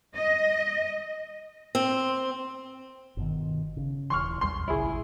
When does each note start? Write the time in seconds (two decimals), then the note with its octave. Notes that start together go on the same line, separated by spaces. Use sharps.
0.16 D#5
1.75 C4
3.17 G1 B2 D#3
3.77 C#3
4.10 D#1 E3 C6 C#6 F6
4.41 A#1 E2 G3 C6
4.68 G#1 C#2 A#2 E4 G#4